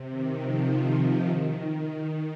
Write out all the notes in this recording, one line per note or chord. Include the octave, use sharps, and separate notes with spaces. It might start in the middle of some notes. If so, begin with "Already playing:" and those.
Already playing: C3
D#3
F3
D#3